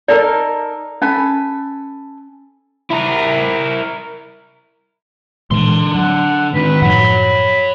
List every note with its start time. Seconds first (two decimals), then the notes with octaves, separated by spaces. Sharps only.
0.08 D#4 A4 A#4 D5
1.02 C#4 A4 G#5 B5
2.90 E4 A#4
5.51 A#2 D3 E3 G#3 C6
5.95 F#3 F#5
6.54 G#2 D#3 B4
6.82 F#2 A2 F3 C#5 F#5 B5